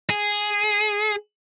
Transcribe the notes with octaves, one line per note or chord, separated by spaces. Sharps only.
G#4